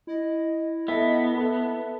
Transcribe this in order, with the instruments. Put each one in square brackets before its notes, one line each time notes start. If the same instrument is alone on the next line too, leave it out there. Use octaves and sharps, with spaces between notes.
[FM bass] E4 [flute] D#5
[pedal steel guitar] B3 [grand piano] A4 E5 [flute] D#5
[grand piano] A4 B4 [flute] E5